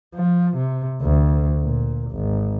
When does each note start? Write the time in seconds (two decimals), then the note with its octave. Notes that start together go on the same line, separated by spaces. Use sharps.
0.15 F3
0.57 C3
1.02 D2
1.63 A#2
2.11 G#1